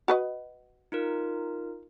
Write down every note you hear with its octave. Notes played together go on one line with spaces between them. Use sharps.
F#4 B4 D#5
D#4 F4 A#4